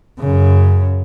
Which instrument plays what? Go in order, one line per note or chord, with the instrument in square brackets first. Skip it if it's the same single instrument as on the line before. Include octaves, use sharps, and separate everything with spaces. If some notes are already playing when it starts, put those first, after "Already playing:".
[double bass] F#2 C#3